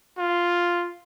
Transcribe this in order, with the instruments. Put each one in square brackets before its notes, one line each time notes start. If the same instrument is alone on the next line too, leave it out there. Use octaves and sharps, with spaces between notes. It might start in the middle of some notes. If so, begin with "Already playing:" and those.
[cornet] F4